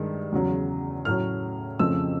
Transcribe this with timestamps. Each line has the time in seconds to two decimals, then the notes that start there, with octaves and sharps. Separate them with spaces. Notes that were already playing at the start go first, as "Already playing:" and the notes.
Already playing: G2 D#3 G#3
0.32 E2 C#3 F#3
1.05 A2 F#3 A3 C#4 F6
1.79 F2 C#3 F3 A3 C4 E6